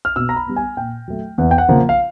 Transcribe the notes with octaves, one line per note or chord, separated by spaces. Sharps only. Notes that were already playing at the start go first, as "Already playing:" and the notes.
F6
B2 E6
A#5
B5
G3 B3
G#5
A#2 G5
F#3 A3
E2 F#5
G5
F#5
C#3 F3 A#3
F5